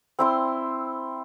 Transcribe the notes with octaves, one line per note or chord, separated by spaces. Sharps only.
C4 E4 C6